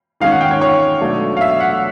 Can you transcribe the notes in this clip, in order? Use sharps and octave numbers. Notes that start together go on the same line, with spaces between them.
D#3 G#3 C#4 F5
F#5
G5
C#5
C#5
B2 F#3 A3 D4
F5
E5
F#5